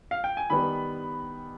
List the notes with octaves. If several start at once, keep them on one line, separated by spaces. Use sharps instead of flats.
F5
G5
G#5
D#3 G3 B3 B5